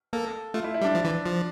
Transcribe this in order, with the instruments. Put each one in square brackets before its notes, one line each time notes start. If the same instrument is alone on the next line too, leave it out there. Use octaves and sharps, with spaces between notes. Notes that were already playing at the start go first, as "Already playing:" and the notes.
[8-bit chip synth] A#3 [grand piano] A4
[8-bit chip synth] A3 [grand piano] F4
[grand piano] E4
E4
[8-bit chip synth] G3
[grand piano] D4
[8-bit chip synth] F3
E3
F3